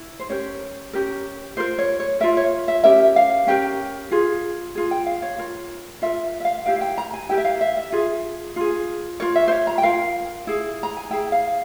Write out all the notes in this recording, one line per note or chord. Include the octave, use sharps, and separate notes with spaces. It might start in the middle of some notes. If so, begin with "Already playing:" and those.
Already playing: E4
C5
C#4 G4 A#4 C#5
C#4 G4 A#4
F4 A#4 C5
C#5
C#5
F4 A#4 E5
C#5
E5
C#4 G4 A#4 E5
F5
C#4 G4 A#4 G5
F4 G#4
F4 G#4
G5
F5
C#5
F4 A#4
F4 A#4 E5
E5
F5
E4 G4 A#4 F5
F5
G5
A#5
G#5
E4 G4 A#4 G5
E5
F5
E5
E5
F4 G#4
F4 G#4
F4 A#4 C#5
E5
C5
C#5
A#5
G5
F4 A#4 F5
E4 G#4
A#5
G#5
E4 G#4 G5
F5